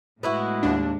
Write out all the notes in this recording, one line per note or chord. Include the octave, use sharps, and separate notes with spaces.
A2 G#3 B3 E4 F#4
D#2 D4